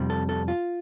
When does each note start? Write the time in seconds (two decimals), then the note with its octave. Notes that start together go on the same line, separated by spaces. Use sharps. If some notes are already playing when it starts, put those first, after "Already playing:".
Already playing: F2 C3 G3
0.10 A4
0.29 A4
0.48 F4